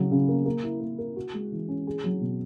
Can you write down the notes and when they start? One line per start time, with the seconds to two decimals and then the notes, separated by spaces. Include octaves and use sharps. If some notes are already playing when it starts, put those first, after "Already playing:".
Already playing: C#3 F#3
0.12 C#3
0.29 A#3
0.46 A#3
0.64 E4
0.81 A#3
0.98 A#4
1.16 F#4
1.33 G#3
1.52 E3
1.69 C#4
1.87 G#4
2.04 F#3
2.21 B2